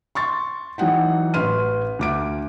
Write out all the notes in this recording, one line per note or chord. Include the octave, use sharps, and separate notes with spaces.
C6 C#6 A6
E3 F#3 D#4 F#5 G5
A1 B4 C6 F6 D#7
D2 D6 D7